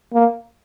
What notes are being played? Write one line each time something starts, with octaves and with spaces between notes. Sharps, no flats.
A#3